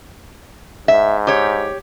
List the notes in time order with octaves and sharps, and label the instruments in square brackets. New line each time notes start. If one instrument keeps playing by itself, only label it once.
[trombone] G#2 [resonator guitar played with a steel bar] E5
[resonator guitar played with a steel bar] G4 C#5